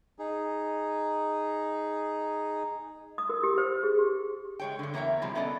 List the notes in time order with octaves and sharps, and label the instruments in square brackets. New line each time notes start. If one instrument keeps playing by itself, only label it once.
[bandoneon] D#4 G#4
[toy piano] D#6
A#4
G4
C5
G#4
G4
[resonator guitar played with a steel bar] G#3 C#5 G5
G2 D3
E2 A#3 A#4 C#5 E5 G5
C3 F3 G3 G#3
B3 C#4 A4 D5 D#5